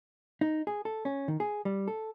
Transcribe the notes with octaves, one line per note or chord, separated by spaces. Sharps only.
D#4
G#4
A4
C#4
D#3
G#4
G3
A4